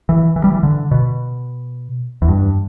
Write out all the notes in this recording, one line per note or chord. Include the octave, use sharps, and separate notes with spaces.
E3
E3
G3
E3
D3
B2
E2
G2